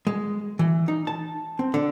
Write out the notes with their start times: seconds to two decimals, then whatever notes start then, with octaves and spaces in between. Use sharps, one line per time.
0.07 G#3
0.59 E3
0.88 D#4
1.07 A5
1.59 C4
1.74 D3